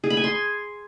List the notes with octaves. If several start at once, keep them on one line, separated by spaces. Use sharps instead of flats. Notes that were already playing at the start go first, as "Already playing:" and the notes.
G#4
B5
G#5
C6